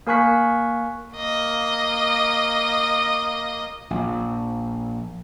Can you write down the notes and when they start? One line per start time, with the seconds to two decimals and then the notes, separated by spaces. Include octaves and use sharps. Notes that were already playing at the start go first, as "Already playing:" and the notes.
0.07 A#3 A#4 G#5 C#6 F#6 B6
1.14 A#3 D#5
3.90 A#1